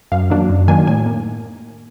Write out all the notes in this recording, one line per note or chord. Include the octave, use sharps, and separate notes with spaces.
F#2 F5
D#3 F#3 A#3 D4
F#2
D#3 F#3 A#3 D4 G#5
A2 G#5
A#3